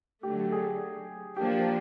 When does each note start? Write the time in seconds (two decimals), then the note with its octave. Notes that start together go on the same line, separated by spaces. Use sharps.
0.23 D3 F#3 A3 G4
0.52 G#4
1.37 F3 A#3 D4 G4